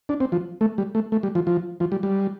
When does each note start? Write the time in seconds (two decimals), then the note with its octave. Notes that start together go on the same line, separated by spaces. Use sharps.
0.09 D4
0.20 C4
0.32 F3
0.61 A3
0.78 G3
0.95 A3
1.12 A3
1.23 G3
1.35 F3
1.47 F3
1.80 F3
1.92 G3
2.03 G3